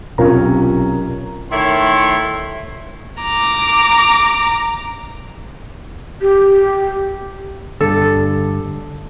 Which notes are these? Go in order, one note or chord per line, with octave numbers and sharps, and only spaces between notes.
B1 C3 C#4 F4 A#4 A#5
D#3 A3 E4 C#5 C6
A#5 D6
G4
G2 D3 A4